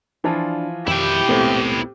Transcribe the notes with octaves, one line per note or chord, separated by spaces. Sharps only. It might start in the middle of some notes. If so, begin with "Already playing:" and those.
E3 F3 D4 F4
F2 D#3 E4 G4 G5
D#1 A#1 A2 B3 C4